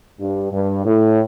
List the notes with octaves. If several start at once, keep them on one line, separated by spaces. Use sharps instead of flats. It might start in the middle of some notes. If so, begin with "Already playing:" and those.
G2
G2
A2